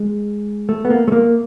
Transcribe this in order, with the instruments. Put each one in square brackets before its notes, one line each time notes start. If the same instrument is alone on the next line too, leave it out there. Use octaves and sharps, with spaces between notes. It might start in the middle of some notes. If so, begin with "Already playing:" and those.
Already playing: [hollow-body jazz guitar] G#3
A3
B3
A#3
A3
A#3